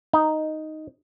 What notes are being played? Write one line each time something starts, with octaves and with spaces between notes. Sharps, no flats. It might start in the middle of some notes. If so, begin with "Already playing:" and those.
D#4